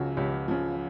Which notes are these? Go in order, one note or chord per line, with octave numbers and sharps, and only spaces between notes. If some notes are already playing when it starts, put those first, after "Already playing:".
Already playing: C#2 C#3 F3 F#4
C#2 G4
C#3 F3